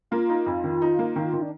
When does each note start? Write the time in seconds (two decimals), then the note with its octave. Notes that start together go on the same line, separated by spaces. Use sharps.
0.11 A#3 F4
0.29 D#4
0.46 F2
0.64 D#3
0.82 D#4
0.99 A#3
1.16 D#3
1.33 D#3
1.42 D4